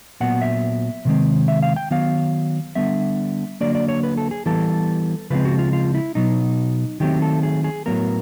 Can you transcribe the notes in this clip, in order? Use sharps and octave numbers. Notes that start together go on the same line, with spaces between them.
A#2 F#3 B3 F#5
E5
C3 D#3 G#3 C4
E5
F5
G5
D#3 F#3 B3 F5
D3 G3 B3 E5
D3 F#3 A#3 D5
D5
C#5
B4
A4
G#4
E3 G3 B3 A4
C#3 F3 G#3 C4 B4
F#4
F4
F4
E4
B2 F#3 B3 D#4
D#3 F#3 A3 C4 G4
A4
G#4
G#4
A2 F#3 B3 A#4